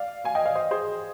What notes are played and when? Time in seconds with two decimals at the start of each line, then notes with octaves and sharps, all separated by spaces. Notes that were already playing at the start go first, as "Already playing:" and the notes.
Already playing: D5 F5
0.24 F5 G#5
0.35 D#5 G5
0.45 D5 F5
0.55 C5 D#5
0.71 G#4 C5